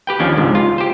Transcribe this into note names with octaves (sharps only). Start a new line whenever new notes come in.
G4 B4 G5
D#2 F3 C#4 D4
C#2 G#2 C3
F4
G4 C5